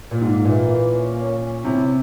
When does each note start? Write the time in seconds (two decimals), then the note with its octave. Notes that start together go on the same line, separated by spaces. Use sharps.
0.11 A#2
0.21 G#2 A#3
0.45 A#2 E3
0.69 A#3
0.93 C#4
1.16 C#4
1.40 C#4
1.64 C3 E4